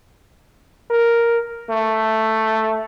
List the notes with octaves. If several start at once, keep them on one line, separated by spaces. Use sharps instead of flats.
A#4
A3